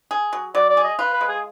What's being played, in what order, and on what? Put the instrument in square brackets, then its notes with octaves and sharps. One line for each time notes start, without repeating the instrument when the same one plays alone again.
[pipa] G#4
F#3
[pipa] F#3 [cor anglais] D5
[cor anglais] D5
[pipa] G#4
[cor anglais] D#5
[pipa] F4 [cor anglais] B4
[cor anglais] B4
[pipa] G#3
[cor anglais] G#4